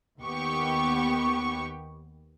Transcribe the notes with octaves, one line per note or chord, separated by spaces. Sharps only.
D#2 B3 G4 C#6